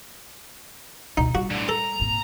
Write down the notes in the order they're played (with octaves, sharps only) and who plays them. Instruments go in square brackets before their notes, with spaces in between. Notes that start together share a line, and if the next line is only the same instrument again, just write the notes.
[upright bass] D2 B2 [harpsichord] D#4
[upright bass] G3 [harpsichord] F#4
[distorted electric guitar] A2 D3
[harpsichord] A4 [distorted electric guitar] A#5
[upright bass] G#1 A#2